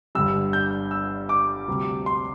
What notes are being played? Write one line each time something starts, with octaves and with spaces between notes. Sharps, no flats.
G1 G2 D3 G3 E6
G6
E6
D6
D2 C3 G3
C6